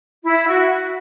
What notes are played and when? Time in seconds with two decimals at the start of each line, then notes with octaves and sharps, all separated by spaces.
0.24 E4
0.46 F#4